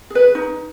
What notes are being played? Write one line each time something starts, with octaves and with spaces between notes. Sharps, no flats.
G#4 B4
D#4